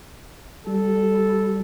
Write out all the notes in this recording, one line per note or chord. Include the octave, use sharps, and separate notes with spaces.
G3 A4